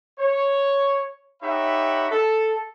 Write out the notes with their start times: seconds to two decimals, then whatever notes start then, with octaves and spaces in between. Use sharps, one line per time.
0.19 C#5
1.42 D#4 G4 C#5 E5 F#5 B5
2.11 A4